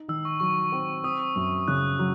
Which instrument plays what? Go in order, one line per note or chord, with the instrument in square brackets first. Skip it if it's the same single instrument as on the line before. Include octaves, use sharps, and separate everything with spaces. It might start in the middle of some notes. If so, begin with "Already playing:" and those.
Already playing: [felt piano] D#4
[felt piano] D#3 [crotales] E6
[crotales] C#6
[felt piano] F#3 [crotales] C#6
[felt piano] C4
[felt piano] C4 [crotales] D#6
[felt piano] F#2
[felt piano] C#3 [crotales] F#6
[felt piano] F#3